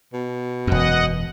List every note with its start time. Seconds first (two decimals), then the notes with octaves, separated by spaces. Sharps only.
0.14 B2
0.67 E1 F#2 D#5 F#5